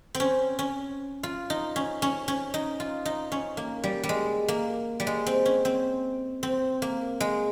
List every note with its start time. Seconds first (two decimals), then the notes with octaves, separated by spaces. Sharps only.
0.15 C4
0.20 C#4
0.59 C#4
1.23 F4
1.50 D#4
1.76 C#4
2.02 C#4
2.28 C#4
2.54 D#4
2.80 F4
3.05 D#4
3.32 C#4
3.57 A#3
3.84 G3
4.03 G3
4.09 G#3
4.48 A#3
5.00 G3
5.07 G#3
5.26 C4
5.46 C#4
5.65 C4
6.43 C4
6.82 A#3
7.20 G#3